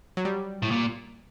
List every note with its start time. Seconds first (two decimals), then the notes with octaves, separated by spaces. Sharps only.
0.17 F#3
0.25 G3
0.62 A2
0.71 A#2